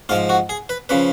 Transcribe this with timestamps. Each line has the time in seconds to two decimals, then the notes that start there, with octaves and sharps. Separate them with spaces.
0.09 G#2 F3 F4
0.29 F#4
0.49 G#4
0.69 B4
0.89 C#3 F3 B4